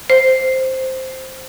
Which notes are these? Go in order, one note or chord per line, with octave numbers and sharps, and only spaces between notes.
C5